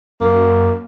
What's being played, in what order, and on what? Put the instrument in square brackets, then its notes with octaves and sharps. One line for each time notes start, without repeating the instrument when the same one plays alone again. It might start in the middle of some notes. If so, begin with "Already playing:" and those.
[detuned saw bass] F#2 [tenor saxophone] A#3